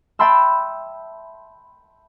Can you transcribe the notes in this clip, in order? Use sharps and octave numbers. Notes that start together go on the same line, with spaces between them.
E5 G5 A5 B5 C6 E6